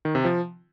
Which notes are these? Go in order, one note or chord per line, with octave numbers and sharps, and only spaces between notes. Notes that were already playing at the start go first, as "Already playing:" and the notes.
D#3
C3
F3